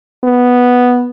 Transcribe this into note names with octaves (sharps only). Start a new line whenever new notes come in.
B3